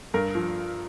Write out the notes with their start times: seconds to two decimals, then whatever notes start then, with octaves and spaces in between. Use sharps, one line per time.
0.14 G2 A#4
0.35 F3